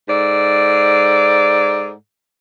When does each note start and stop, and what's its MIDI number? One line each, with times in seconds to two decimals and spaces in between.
0.08 1.91 44
0.08 1.91 69
0.08 1.91 74